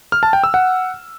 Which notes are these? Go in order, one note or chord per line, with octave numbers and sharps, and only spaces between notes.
F6
A5
G5
E6
F#5